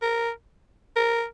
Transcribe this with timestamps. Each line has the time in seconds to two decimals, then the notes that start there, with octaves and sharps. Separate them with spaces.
0.02 A#4
0.96 A#4